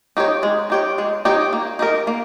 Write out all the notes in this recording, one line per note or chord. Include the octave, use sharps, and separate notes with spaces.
D#4 G4 C#5
G#3
D#4 G4 C#5
G#3
D#4 G4 C#5
A#3
D#4 G4 A#4
A#3